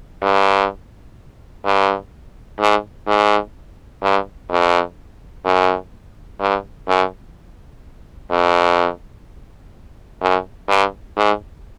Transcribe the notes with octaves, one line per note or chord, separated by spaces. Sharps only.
G2
G2
G#2
G#2
G2
F2
F#2
G2
F#2
F2
F#2
G2
G#2